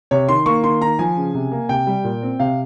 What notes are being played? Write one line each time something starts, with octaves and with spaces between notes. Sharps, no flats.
C3 C#5
D#3 C6
A#3 C#6
D#3 C6
D#3 A#5
F3 G#5
C#3
C3
A#3
C3 G5
G3
A#2
C4
C3 F5